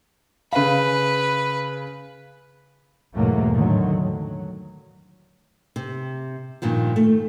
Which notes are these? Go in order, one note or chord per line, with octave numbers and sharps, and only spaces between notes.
C#3 B4 F5
E2 G#2 B2 F#3 A3 A#3
A2 D3 D#3 F#3
F#3
C3
G2 A#2 D#3 F3
A3